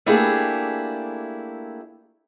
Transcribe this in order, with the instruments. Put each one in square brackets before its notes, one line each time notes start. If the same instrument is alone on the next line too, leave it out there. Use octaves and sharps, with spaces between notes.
[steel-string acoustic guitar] A3 A#3 D4 E4 G4 G#4